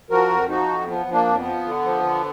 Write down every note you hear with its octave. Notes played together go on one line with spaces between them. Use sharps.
F3 F#4 A#4
F2
F3 D#4 F#4
F2
F3 B3
F3
A#3 D4
F2
B3
F3
D3
F3
D3